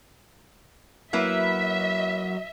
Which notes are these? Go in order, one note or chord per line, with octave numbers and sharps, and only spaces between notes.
F#3 A#3 E4 B4 E5